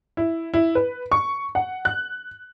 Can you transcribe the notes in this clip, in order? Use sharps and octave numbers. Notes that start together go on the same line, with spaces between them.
E4
E4
B4
C#6
F#5
F#6